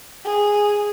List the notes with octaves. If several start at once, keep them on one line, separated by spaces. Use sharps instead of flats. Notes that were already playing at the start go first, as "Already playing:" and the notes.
G#4